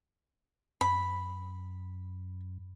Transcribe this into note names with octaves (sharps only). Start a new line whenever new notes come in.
F#2 B5